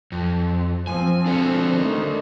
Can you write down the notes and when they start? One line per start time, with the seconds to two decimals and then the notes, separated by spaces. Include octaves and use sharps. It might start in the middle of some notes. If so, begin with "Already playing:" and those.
0.12 F2
0.87 F3 C4 G#5
1.26 D4 A4 C5
1.77 D#3 A3